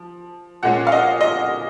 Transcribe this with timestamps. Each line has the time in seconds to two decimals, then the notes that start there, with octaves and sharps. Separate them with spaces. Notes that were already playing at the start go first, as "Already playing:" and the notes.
Already playing: F3
0.63 A#2 G#3 C#4 F#5
0.87 F5
0.92 D#5
1.21 D#5